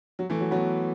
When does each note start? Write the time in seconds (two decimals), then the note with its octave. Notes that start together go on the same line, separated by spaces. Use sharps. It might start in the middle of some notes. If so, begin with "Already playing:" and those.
0.19 F#3
0.30 E3 A3
0.41 F#3
0.51 F#3 B3